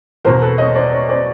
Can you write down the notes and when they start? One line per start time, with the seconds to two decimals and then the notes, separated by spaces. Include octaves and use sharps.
0.25 E2 B2 A#4 C5
0.42 A4 B4
0.58 C#5 D#5
0.75 C5 D5
0.92 B4 C#5
1.09 C5 D5